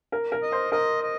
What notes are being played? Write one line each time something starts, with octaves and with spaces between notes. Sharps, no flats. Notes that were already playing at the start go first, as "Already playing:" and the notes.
A#4
A#4
D#5
C5
A#4 D#5
D#5